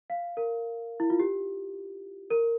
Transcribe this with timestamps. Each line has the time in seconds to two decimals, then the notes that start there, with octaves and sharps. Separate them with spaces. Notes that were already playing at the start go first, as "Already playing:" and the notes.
0.10 F5
0.37 A#4
1.00 E4
1.10 F4
1.20 G4
2.30 A#4